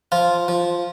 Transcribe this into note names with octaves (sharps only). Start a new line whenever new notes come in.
F3 F4
F3